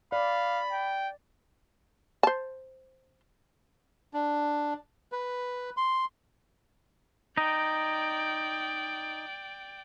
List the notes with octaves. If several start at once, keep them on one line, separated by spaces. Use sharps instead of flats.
D5 F5 B5
G5
C5 A5
D4
B4
C6
D#4 D5 G5